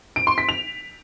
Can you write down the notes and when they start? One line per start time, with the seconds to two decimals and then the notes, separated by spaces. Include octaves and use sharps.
0.16 D7
0.27 C6
0.38 B6
0.49 F7